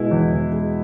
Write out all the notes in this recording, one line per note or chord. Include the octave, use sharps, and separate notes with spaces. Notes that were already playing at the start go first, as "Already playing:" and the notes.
Already playing: B2 G#3 E4
E2
E2
G#3